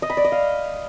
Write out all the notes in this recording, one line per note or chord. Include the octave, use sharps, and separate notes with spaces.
D#5
B5
D5
D#5
F5